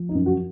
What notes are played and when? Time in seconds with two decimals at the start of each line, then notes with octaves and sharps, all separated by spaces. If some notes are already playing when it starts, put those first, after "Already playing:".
Already playing: F3
0.09 D#4
0.15 F#2
0.26 F#4